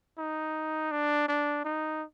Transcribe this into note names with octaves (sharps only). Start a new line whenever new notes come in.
D#4
D4
D4
D#4